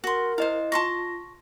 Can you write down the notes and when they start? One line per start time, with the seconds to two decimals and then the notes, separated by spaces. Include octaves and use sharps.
0.04 F#4 A#4 C6
0.38 E4 C5 D#5 F5
0.72 F4 A5 C6 C#6 A#6